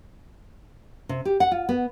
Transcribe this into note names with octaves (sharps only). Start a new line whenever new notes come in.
C3
G4
F#5
F4
B3